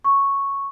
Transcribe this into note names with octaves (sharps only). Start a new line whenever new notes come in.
C#6